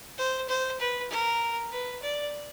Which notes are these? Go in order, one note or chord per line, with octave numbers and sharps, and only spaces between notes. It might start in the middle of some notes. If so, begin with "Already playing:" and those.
C5
C5
B4
A#4
B4
D5